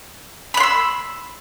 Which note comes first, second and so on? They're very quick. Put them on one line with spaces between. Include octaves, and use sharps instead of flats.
B5 F#6 C6 E6